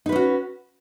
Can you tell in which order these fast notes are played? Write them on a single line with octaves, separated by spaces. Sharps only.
D#4 B4 C#4 F#4